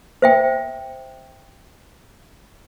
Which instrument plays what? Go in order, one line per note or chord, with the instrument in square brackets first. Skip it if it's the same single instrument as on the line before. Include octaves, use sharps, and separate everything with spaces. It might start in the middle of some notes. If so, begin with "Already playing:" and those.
[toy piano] C5 E5 G5